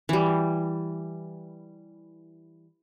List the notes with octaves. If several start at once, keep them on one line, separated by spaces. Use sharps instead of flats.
E3 G3